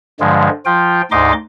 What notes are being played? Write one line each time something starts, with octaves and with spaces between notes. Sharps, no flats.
G2 D3 F3 G#3
F3 F4 G5
D2 G#2 D#4 D#5 C6 D6